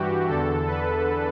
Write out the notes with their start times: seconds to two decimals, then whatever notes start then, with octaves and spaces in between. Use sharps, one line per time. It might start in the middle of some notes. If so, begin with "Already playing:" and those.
Already playing: G2 E3 F#4 G4
0.28 E2 D3 A4
0.67 B4